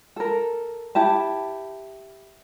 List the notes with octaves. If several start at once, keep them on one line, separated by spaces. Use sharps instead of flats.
A4 A#4
E4 G4 A5